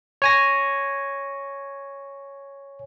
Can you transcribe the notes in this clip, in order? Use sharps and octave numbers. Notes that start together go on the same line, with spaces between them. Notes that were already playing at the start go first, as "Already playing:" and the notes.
C#5 G#5 A#6